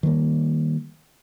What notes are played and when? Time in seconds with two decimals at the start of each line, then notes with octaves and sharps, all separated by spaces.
0.03 D#3 G3 A3 A#3